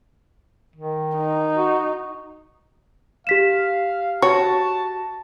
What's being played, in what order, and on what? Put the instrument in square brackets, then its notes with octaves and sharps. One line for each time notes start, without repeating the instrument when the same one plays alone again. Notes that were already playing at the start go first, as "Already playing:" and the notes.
[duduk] D#3
[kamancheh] D#4
[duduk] F#4
[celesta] G4 B6 E7 [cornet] F5
[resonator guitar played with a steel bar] F#4 [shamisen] C#5 [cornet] A5